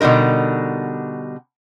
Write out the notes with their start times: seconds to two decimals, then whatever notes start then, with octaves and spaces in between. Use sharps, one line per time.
0.01 B2 D3 G3 D#4 A#4